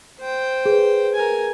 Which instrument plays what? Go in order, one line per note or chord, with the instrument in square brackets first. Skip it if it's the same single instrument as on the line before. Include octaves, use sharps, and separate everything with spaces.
[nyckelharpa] C5 G5
[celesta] G#4 B4
[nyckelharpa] A#4 G#5